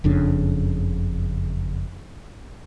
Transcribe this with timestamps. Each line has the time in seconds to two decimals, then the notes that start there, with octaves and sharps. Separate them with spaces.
0.04 F#1 F2 C#3 D4